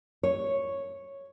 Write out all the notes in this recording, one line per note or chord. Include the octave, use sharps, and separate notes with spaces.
C#5